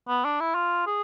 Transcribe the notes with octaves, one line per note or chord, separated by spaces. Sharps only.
B3
D4
E4
F4
G#4